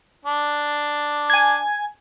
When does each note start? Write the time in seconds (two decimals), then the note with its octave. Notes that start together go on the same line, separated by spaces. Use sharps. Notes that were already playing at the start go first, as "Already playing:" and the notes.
0.25 D4
1.30 G#5 G#6